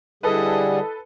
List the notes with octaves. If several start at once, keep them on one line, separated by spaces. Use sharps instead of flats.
D3 G3 E4 G#4 A4 B4 D#5